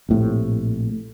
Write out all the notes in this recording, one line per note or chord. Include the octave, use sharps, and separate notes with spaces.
A#1 A2 C3